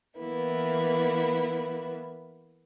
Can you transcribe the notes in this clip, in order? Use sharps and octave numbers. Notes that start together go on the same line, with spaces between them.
E3 A#3 B3 E4